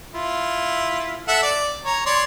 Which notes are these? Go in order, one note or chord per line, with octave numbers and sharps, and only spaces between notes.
E4 F4
A4 E5 F#5
D5
C#5 A#5
C#5 D5 C6